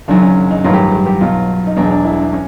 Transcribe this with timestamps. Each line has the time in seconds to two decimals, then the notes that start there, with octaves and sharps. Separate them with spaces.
0.08 F#1 F#2 D#3 F#3 D4
0.22 C#4
0.51 D#4
0.64 A1 G2 D#3 F#3 F4
0.74 G4
0.92 G4
1.06 G4
1.21 B1 B2 F#3 F4
1.67 D#4
1.76 E1 E2 B2 F#3 D4
1.91 D4
2.05 E4
2.19 D4
2.33 C#4